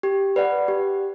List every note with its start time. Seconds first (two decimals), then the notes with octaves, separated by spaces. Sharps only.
0.03 G4
0.36 B4 D5 F#5
0.68 G4